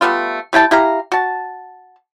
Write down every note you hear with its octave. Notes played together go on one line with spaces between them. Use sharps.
G3 A3 B3 F4
G3 E4 G5 A5
E4 G4 F5 A#5
F#4 A5